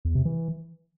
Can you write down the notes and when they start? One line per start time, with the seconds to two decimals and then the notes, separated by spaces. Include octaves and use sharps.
0.05 E2
0.15 C3
0.25 E3